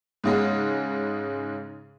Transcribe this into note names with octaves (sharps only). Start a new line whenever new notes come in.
G#2 C#3 G#3